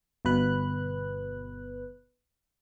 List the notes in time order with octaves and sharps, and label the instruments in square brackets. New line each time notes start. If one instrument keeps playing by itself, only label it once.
[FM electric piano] G1 B2 B4 F#6